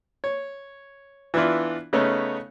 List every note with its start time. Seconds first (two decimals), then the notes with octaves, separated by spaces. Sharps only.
0.24 C#5
1.34 E3 B3 D4 E4 F4
1.93 C#3 A3 B3 C#4 D#4